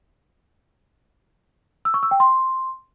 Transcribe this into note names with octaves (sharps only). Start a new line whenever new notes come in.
E6
C#6
E6
G5
C6